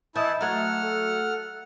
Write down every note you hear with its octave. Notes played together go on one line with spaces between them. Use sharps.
E3 E4 D#5 A5 D#6 G6
F#3 A3 F#5 A#5 F6 G#6
A4